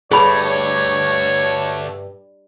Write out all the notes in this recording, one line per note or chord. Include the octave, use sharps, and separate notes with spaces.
G2 D3 A3 G#4 C#5 B5